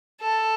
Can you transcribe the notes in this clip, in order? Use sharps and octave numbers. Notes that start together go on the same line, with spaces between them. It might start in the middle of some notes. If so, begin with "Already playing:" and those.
A4